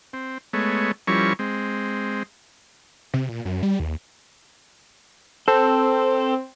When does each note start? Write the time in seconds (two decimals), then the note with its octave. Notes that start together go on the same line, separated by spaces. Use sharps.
0.13 C4
0.53 G#3 A3 B3 C#5
1.07 F3 G3 C#4 E4 A#4 C#6
1.39 G#3 C4
3.14 C3
3.29 A#2
3.45 F#2
3.63 G3
3.80 D#2
5.48 C4 A4